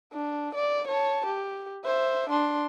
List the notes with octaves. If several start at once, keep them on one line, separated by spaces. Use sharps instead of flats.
D4
D5
C#5 A5
G4
C5 E5
D4 C6